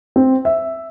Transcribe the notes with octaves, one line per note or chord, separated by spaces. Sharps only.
C4
E5